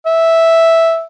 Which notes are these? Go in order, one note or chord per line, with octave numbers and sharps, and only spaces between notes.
E5